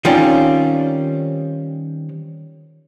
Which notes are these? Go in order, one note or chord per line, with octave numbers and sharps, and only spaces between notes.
D#3 G3 C4 C#4 F4